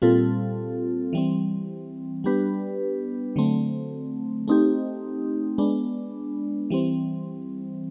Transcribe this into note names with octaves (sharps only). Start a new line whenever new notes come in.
A#2 G3 C4 F4 A4
E3 G3 C4
G3 B3 D4 G4 B4
D3 F#3 A3 C4
A3 C4 D#4 G4
G#3 B3 D4
E3 G3 C4